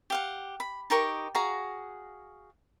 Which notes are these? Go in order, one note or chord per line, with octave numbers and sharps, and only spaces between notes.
G4 F5 F#5
B5
D#4 G4 A#4 C#6
F#4 G#4 F5 A#5